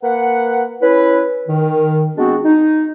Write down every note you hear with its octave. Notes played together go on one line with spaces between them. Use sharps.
A#3 B4 F#5
C#4 E4 B4
D#3
G#3 B3 C4 D4 F#4
D#4